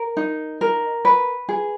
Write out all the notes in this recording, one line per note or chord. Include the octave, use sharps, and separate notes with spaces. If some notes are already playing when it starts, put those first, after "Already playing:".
Already playing: A#4
D#4
A#4
B4
G#4